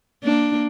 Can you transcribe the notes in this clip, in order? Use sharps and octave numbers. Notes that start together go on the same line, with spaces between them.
A#3 D4